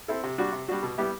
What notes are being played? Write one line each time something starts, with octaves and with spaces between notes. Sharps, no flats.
C4 E4 A4
C3
G3 D4 F#4
C3
G3 D4 F#4
B2
G3 B3 E4 G4